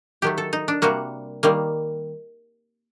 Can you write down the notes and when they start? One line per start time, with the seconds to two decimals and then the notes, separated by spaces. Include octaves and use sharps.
0.22 D#3 F#3 A3 G4
0.38 A4
0.53 D#4
0.68 D4
0.82 C3 G3 A#3 F#4
1.43 D#3 G3 A#3